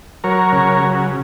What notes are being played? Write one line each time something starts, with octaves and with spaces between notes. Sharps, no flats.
F#3 A#4 C#5
C#3
F#3